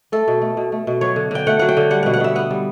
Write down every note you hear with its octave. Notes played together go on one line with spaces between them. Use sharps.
A3 A4
B2
A3
B2
A3
B2
F#3 C#5
D3
D3 G5
A3 F#5
F#3 F#5
G5
D3
G3 F#5
B2 F#5
F#5
B2 E5
B3 F#5
G3